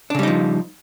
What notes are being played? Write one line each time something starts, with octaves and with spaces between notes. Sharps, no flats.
C#3 F3 G3 D4 D#4